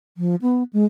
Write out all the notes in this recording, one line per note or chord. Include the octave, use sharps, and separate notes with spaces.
F3
B3
G#3